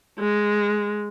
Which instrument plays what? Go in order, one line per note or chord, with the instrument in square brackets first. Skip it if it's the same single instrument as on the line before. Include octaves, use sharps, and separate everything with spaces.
[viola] G#3